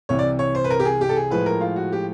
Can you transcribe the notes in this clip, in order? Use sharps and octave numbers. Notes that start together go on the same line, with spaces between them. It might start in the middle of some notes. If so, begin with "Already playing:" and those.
C2 C3 E3 C#5
D5
C#5
C5
B4
A#4
G4
G#4
G4
A4
G#4
A2 F3 G#3 B4
A#4
F4
F#4
G4